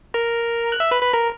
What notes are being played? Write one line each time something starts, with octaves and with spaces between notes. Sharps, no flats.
A#4 A#5
F#6
E5 E6
B4 B5
B4 B5
A#4 A#5